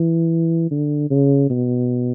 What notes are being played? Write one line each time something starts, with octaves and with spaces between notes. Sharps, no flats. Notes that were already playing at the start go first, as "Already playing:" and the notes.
Already playing: E3
D3
C#3
B2